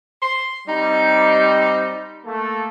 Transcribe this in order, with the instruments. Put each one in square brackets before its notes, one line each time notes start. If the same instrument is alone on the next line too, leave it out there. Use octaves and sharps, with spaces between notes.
[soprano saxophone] C6
[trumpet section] G3 C4 [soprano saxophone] D#4
[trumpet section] A3 A#3 A4